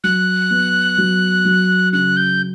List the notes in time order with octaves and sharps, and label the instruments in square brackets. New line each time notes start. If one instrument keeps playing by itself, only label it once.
[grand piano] F#3 [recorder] F#6
[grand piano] B3
F#3
F#3
[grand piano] C#3 [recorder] F#6
[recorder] G6